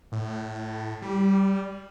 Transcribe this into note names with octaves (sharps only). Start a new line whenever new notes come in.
A2
G3